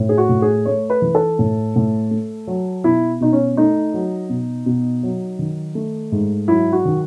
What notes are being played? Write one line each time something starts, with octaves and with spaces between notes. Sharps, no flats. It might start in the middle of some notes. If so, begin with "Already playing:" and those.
Already playing: A2
G#4
F#4
A2
G#4
A3 C#5
B4
E3
A4
A2
A2
A3
F#3
B2 E4
B2 D#4
C#4
A3 D#4
F#3
B2
B2
F#3
D#3
A3
G#2
F#3 E4
F#4
D#3